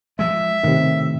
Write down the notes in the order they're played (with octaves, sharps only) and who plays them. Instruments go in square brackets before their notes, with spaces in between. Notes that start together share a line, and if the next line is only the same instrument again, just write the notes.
[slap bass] F3 G#3 [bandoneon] E5
[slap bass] A2 [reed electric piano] C3 D#3